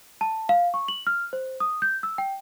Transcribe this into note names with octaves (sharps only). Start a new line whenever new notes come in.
A5
F5
C#6
F#7
F6
C5
D#6
G6
E6
G5